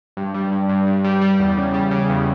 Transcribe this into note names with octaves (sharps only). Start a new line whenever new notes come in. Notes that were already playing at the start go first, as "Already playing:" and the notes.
G2
G3
G2
G2
G2
G3
G3
E2
C#3
G3
C#3
E2